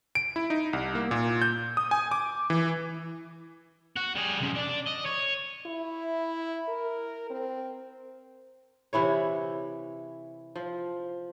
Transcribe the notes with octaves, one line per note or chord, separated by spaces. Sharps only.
D7
E4
D#4
C2
A#3
A#2
G6
D#6
G#5
D6
E3
F#4
G3 G#4
F#2 C3
D4 D5
D#5
C#5
E4
A#4
C4
C3 E3 E4 C#5
F3